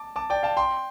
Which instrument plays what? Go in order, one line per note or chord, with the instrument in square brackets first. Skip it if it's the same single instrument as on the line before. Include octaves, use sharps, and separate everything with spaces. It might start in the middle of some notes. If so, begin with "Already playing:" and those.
Already playing: [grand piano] A5 D6
A5 D6
D5 G5
F5 A5
G5 C6